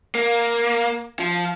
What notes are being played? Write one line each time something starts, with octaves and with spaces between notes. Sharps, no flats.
A#3
F3